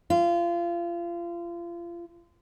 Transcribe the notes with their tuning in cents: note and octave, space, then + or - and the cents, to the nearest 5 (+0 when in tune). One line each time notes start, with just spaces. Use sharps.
F4 -30